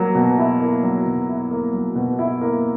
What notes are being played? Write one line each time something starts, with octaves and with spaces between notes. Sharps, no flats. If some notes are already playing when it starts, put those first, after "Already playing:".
Already playing: F#3 A#3
B2
E4
A#3
F#3
B2
E4
A#3
F#3
B2
E4
A#3